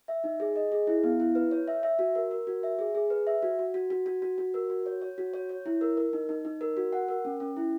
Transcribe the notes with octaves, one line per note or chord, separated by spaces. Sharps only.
E5
D#4
G#4
D#5
G#4
E4
B3
E4
B4
C#5
E5
E5
F#4
A#4
A#4
F#4
E5
G#4
G#4
B4
E5
F#4
F#4
F#4
F#4
F#4
F#4
F#4
A#4
F#4
C#5
C#5
F#4
C#5
C#5
E4
A#4
A#4
D#4
D#4
D#4
A#4
F#4
F#5
A#4
C#4
C#4
E4